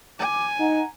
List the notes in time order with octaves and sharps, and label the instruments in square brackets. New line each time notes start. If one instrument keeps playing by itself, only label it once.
[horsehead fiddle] G#5 [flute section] D6
[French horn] D#4 [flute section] F#5 A#5